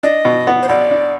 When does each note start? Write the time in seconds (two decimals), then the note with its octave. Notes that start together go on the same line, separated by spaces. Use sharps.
0.03 D4 D#5
0.25 B2
0.47 B3
0.63 C5
0.69 B1 D5
0.91 D4